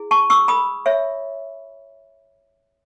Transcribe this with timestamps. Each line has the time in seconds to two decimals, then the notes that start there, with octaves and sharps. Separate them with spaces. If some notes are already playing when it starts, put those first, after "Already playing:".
Already playing: E4 G#4
0.11 A5 C#6
0.30 C#6 E6
0.48 B5 D#6
0.86 C#5 E5